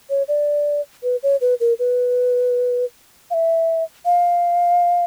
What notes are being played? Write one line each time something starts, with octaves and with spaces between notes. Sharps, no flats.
C#5
D5
B4
C#5
B4
A#4
B4
F5
E5
F5